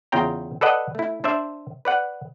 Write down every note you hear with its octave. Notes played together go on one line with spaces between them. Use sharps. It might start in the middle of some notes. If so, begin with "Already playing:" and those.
E2 C#3 F4 G5 A#5
A4 B4 D5 D#5 F#5
A3 E4
D4 C5 D5 E5
B4 D5 F#5